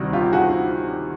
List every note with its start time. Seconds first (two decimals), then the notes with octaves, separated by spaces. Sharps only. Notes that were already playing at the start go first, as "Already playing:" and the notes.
Already playing: D2 C3 D#3 G3 F#4
0.13 F4 G4
0.32 F#4 G#4